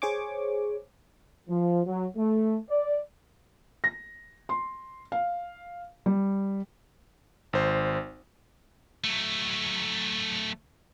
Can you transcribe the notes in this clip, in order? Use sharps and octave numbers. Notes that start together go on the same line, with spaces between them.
G#4 C5 C#5 G#5 C#6 D6
F3
F#3
A3
D5
A#6
C6
F5
G3
G#1 C5
F#3 A3